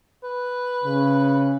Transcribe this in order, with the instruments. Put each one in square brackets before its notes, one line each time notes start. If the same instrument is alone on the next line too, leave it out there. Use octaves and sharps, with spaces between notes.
[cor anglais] B4
[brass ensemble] C#3